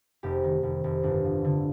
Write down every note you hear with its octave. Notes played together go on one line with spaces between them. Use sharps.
F1 G4
D#3
F1
F1
G1 D4
F3
D3